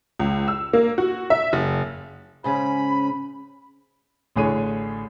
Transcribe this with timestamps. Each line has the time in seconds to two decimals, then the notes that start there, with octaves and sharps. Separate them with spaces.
0.20 C#2
0.48 E6
0.73 A#3
0.98 F#4
1.30 E5
1.53 F#1
2.44 G#2 C#3 C#4 B5
4.36 A1 A2 D3 G#4 C#5 D#7